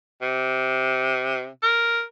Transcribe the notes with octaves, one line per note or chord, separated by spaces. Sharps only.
C3
A#4